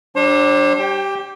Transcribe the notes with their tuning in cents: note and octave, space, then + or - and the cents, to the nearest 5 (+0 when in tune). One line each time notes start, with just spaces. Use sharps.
G3 -40 D4 +0 C5 +45
G4 -10 G5 +20